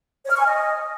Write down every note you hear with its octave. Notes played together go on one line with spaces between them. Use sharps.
C#5
F6
C#6
G#5
D#5